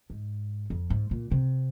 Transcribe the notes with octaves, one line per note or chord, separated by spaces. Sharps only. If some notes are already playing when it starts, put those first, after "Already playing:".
G#2
F2
G#2
A#2
C3